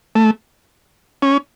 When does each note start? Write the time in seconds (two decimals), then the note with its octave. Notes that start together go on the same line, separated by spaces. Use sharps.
0.15 A3
1.22 C#4